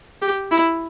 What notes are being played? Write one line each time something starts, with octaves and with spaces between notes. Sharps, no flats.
G4
E4